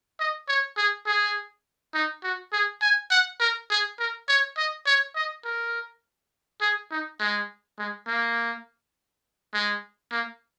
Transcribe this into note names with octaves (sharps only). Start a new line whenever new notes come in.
D#5
C#5
G#4
G#4
D#4
F#4
G#4
G#5
F#5
A#4
G#4
A#4
C#5
D#5
C#5
D#5
A#4
G#4
D#4
G#3
G#3
A#3
G#3
A#3